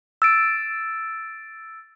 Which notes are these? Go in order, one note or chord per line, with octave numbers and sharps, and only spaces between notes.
E6 A6 D7